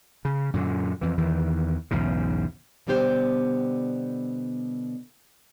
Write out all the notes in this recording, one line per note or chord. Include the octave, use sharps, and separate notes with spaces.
C#3
F#2 A#2 D3
F2 E3
E2 D#3 E3
B1 E2 G#2 C#3
B2 D3 G3 B3 G4 C5